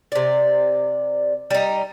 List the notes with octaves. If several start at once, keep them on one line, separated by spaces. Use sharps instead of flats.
C3 D5
G3 D#4